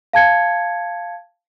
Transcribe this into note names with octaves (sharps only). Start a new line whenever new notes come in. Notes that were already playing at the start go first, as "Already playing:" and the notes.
F5 A5 G#6 C#7